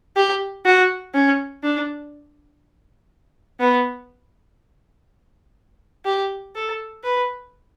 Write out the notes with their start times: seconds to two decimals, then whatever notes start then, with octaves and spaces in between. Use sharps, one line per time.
0.16 G4
0.65 F#4
1.14 C#4
1.63 D4
3.60 B3
6.05 G4
6.55 A4
7.04 B4